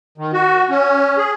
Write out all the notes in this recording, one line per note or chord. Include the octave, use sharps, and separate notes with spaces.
D#3
F#4
C#4
G#4